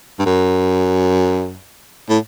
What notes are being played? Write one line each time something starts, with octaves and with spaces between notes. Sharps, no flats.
G2
F#2
A2